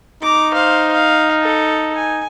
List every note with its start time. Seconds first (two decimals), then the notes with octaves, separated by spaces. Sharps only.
0.23 D#4 A#5 D6
0.54 C5 F5
0.93 F5
1.42 A4
1.95 G#5